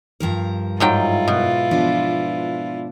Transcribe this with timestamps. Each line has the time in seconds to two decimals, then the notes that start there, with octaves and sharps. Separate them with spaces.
0.20 G2 F3 A#4
0.80 G#2 F#3 E4 F4 G5
1.28 B2
1.71 F3 B3 D4